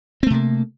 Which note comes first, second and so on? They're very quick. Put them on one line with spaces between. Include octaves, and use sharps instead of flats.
C4 A3 C3 A#3